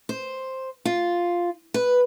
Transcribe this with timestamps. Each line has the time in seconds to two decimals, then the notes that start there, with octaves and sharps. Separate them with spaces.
0.09 C5
0.85 F4
1.74 B4